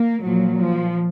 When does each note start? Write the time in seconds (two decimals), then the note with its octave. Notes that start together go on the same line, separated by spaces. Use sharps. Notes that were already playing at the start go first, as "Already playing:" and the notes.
Already playing: A#3
0.23 A#2 F3 F#3
0.59 F3